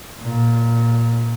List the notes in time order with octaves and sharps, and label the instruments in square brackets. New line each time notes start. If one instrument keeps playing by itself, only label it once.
[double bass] A#2